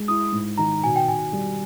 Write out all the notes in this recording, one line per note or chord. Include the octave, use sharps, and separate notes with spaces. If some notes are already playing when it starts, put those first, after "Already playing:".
Already playing: G#3
E4 D#6
G#2
D#3 A#5
B2 G#5
G5
B2 G#5
G3